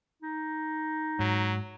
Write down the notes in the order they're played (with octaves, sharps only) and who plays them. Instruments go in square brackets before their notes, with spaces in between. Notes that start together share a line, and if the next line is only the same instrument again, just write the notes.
[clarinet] D#4
[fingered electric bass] G#2 [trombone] F#3